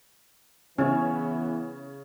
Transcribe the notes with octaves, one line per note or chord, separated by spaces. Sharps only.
C#3 E3 B3 C#4 E4 C#5